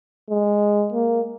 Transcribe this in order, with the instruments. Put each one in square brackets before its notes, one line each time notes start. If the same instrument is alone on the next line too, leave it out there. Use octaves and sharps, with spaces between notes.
[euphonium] G#3
A#3